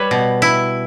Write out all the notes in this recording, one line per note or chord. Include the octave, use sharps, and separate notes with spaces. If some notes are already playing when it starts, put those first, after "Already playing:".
Already playing: G3 B4 C#5
B2
E4